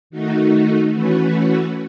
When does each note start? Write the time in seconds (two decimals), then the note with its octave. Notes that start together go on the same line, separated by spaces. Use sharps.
0.10 D#3 A3 D#4 F#4
0.93 E3 A3 C#4 F#4 B4